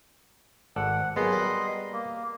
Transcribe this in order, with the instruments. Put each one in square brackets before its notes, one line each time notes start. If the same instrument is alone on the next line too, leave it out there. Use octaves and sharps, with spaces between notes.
[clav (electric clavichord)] G#1 A4 D5 [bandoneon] F#5
[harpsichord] F#3 A#3 G#4 [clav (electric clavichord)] B3 [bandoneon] D#5 C6
[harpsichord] G3 A#4 B5
[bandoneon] A#3